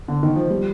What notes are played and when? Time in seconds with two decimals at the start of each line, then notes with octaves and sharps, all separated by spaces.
0.08 D3
0.23 D#3
0.36 F3
0.50 G3